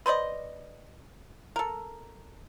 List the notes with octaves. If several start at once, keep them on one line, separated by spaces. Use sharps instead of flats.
B4 C5 D5 D#5
A4 A#4